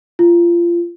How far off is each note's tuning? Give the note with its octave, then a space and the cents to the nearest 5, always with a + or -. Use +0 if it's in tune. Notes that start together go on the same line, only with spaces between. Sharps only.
F4 -25